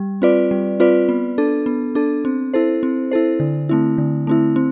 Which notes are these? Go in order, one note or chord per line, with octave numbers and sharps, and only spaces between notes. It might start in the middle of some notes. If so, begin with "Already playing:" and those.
Already playing: G3
C4 F4 B4 D5
G3
C4 F4 B4 D5
B3
D4 A4
B3
D4 A4
C4
E4 A4 C5
C4
E4 A4 C5
D3
A3 C4 E4
D3
A3 C4 E4
C4